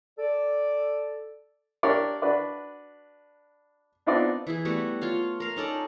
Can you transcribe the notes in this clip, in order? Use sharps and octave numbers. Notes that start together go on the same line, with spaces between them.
A4 D5
D4 G4 A#4 C#5 D5
D4 F#4 B4 D5
B3 C4 D4 D#4 F4 D5
E3 E4 G#4
G3 A3 B3 F#4
F4 C#5 F5
A#4 F5
C#4 D#4 A4 D5